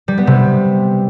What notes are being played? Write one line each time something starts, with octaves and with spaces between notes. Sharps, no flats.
G3
B3
C3